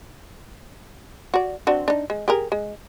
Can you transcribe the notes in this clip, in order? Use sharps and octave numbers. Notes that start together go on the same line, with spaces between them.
F#4 D5
C4 D4 F#4
D4 D#4
G#3
G4 G#4 A#4
G#3